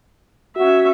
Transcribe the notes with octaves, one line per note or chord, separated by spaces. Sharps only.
C#4 F#4 E5